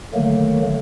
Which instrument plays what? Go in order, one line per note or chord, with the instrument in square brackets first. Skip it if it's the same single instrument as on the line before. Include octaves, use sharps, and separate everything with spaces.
[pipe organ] D3 D#3 F#3 A3 A#3